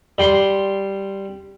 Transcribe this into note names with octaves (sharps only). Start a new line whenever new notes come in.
G3 G5 C6